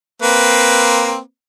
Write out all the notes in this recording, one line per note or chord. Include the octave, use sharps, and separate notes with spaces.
A#3 C4 B4